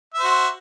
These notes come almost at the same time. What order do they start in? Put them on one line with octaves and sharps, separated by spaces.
E5 C5 F#4